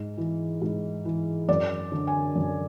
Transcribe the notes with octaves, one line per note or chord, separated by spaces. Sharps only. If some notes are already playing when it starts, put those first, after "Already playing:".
Already playing: G#2
E3
G#2
E3
F#2 D5
D3
G#5
F#2